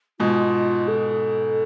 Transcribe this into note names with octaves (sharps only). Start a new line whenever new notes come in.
G#2 B2 F4
A4